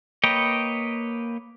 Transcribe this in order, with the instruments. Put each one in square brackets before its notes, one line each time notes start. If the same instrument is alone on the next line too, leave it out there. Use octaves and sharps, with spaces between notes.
[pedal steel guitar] A#3 B4 C#5 D#5 G5